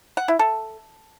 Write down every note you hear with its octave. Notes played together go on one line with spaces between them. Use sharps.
F#5
E4
A4